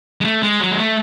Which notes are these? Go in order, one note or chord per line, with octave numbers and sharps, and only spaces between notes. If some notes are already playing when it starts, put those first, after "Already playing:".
G#3
A3
G#3
F#3
G#3
A3